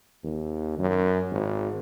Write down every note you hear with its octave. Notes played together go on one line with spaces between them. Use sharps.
D#2
F#2
G#1